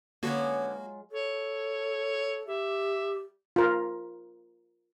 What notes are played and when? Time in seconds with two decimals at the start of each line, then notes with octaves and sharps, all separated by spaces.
0.23 D3 F#3 G#3 A#3 B3 C#4 F4 F#4
1.11 A4 C#5
2.47 G4 E5
3.56 F4 A#4